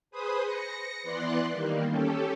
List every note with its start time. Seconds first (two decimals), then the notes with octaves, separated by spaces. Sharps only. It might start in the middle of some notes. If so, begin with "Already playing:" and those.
0.11 G#4 B4 C5 B5 D#6
0.43 A#6 C#7
1.03 E3 B3 D5 C6 F#6
1.52 D#3 G3 A#3
1.88 C#4 G4 A4